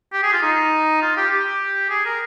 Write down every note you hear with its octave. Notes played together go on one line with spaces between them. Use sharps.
G4
G#4
F4
D#4
F4
G4
G4
G#4
A#4